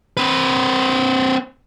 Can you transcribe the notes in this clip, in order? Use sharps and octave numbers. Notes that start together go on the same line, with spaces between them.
C4 B4